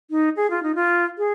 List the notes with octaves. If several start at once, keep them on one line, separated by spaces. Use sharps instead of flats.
D#4
G#4
F4
D#4
F4
G#4